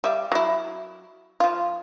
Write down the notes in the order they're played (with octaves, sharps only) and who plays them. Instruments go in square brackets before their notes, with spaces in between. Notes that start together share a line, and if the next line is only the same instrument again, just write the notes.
[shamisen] G3 E5 F5
F#3 E4
F3 F4